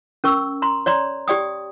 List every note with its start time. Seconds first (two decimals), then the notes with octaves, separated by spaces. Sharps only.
0.24 C#4 A#4 C#6 E6
0.62 A#5 C6
0.86 C#5 D5 A#5 C6
1.28 G4 D5 G5 D#6